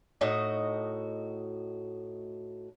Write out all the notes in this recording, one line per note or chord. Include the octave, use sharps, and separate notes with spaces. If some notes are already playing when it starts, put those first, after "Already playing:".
A2 D#4 F#4 D#5